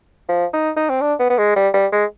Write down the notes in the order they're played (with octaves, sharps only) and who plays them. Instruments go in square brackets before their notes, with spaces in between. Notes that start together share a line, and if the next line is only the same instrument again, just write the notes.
[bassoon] F3
D#4
D#4
C4
D4
B3
B3
G#3
G3
G3
G#3